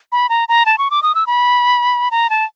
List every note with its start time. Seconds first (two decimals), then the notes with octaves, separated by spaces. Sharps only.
0.12 B5
0.29 A#5
0.48 A#5
0.66 A5
0.78 C#6
0.91 D6
1.03 D#6
1.15 E6
1.27 B5
2.11 A#5
2.30 A5